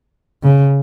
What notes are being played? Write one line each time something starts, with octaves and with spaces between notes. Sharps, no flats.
C#3